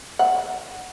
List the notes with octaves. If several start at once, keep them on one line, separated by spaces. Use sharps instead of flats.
F#5